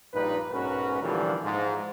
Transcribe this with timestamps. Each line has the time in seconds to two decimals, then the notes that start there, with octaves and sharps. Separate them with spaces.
0.13 A#1 G2 A#2 D#4 B4
0.52 B1 G#2 C#4 F#4 A#4 B4
1.02 A#2 D3 E3 F3 G3
1.43 G#2 F3